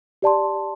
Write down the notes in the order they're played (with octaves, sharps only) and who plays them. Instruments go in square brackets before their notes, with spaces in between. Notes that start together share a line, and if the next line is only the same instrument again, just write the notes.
[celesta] G4 D5 A5 C6